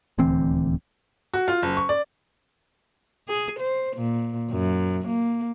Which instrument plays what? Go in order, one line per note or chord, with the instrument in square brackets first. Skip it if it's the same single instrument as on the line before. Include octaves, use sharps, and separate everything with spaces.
[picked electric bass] D#1 D2 E3 C4
[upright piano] F#4
F4
F#1
C#6
D5
[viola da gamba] G#4
C5
A#2
F#2
A#3